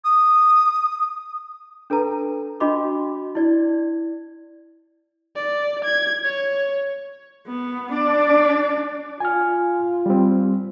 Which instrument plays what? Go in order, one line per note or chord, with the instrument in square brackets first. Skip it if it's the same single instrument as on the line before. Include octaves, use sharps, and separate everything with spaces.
[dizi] D#6
[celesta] D4 A4 B4 A#5
D4 F#4 D#5 C6 D6
E4 D5 G#6
[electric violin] D5
G#6
C#5
[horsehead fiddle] B3
D4 D5
[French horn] F4 [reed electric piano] G#5 F6
[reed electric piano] G3 C4